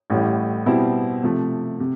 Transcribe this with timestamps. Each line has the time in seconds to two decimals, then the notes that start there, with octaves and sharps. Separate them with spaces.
0.10 A1 A2 G3
0.66 B2 G3 C4 E4
1.23 C3 F3 A3
1.80 C3